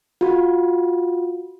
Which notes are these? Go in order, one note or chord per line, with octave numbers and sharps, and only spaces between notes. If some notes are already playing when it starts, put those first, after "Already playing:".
F4 F#4